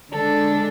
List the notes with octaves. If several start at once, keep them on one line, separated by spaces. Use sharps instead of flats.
D3 G#3 D4 A4